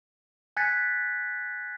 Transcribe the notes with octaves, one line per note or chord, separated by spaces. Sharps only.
G#5 F#6 G#6 A6 B6 C#7